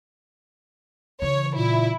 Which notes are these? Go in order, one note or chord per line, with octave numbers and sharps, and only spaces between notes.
C#3 E3 C#5
A#2 E4